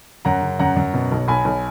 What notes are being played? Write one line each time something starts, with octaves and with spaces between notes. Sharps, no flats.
F#2 F#5 A#5
C#3
F#2 F#5 A#5
F#2
B2
B1
B1 G#5 B5
B1